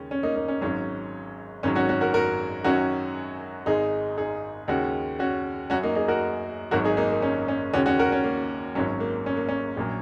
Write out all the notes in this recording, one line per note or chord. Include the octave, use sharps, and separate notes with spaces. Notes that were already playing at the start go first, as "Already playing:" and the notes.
Already playing: D#2 C#3 G#3 C#4
C#4
A#3 D#4
A#3 D#4
C#4
G#1 G#2 F#3 C#4
G#1 G#2 D#3 F#3 C#4
C#4 F#4
C#4 F#4
F#4 A#4
F#4 A#4
F#2 D#3 F#3 C#4 F#4
G#1 G#2 G#3 D#4 G#4
D#4 G#4
D#2 C#3 G#3 C#4 F#4
C#4 F#4
F#2 F#3 C#4 F#4
A#3 D#4
D#4 G#4
F#4 A#4
G#1 G#2 F#3 F#4 A#4
D#4 G#4
A#3 D#4
A#3
C#4
C#4
D#2 C#3 G#3 C#4 F#4
C#4 F#4
F#4 A#4
C#4
A#3
G#1 G#2 F#3 C#4
A#3
C#4
A#3
C#4
A#1 A#2 F#3